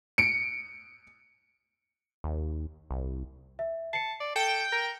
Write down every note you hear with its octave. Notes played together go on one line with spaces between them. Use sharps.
C#7 D7
D#2
C2
E5
A5 C7 C#7
D5
A4 G5
A#4